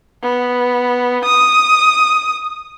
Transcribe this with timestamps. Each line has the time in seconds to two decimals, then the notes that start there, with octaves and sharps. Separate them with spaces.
0.23 B3
1.24 D#6